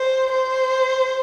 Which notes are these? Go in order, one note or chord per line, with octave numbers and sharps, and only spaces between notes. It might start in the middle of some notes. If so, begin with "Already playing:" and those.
Already playing: C5
C5